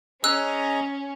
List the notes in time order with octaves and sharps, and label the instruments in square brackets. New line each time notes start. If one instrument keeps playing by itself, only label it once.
[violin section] C#4 [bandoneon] G#4 D#5 A#5 [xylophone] E6 F#6